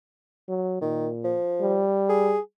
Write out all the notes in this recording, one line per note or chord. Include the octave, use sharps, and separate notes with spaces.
F#3
A#2 D#3
F3
G3
G#4